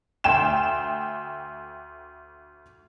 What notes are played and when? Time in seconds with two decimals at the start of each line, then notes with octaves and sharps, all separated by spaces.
0.24 D2 G5 E7